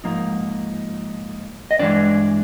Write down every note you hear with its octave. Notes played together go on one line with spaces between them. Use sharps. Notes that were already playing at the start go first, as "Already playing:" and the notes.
G#2 F3 A#3 D#4
D#5
G2 E3 G#3 D4 D5